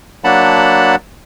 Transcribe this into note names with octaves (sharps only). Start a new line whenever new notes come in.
F#3 A#3 D4 F#5 A5 B5